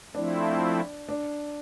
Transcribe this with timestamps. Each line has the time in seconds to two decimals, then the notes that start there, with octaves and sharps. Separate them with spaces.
0.15 F3 A3 C4 D4 E4
1.09 D4